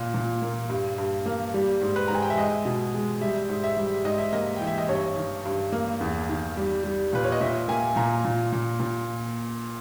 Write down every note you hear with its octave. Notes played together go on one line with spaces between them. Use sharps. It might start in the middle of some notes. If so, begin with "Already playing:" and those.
Already playing: A#2
A#2
A#3
G2
G2
A#3
G3
G#2
B4
G#2 A#5
G#5
G5
E5
G#3 D#5
B2
G#3
G3 E5
G#2
E5
G3
G#2 D#5
E5
A#3 D#5
E3 G5
E5
D#5
G2 C#5
D#3
G2
A#3
E2
D#3
G3
G3
A#2 B4
C#5
D#5
A#2 E5
A#3 G#5
A#2 A#5
A#2
A#2
A#2